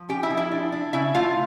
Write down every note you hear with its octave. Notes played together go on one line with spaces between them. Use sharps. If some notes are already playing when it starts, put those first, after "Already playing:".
Already playing: F3
C#4 G4 G5
E4 E5
F3
E4 E5
D4
D4
C#3 E4 E5
A3 F4 F5